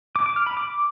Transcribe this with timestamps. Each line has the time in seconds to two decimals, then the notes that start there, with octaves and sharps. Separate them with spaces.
0.16 D6
0.26 D6
0.36 F6
0.46 B5
0.57 D6